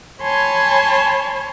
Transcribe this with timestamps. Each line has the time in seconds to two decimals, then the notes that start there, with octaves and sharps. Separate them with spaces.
0.22 C#5 G#5 A5 B5 C6